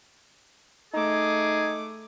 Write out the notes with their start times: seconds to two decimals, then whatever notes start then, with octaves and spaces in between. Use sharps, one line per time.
0.94 A3 D#4 G#4 D6